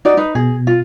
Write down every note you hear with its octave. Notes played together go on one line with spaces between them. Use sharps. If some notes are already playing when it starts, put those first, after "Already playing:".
D#4 F#4 D5
D#4 B4
B2 G#4
F4